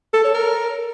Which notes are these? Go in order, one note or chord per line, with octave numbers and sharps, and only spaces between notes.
A4
C#5
A#4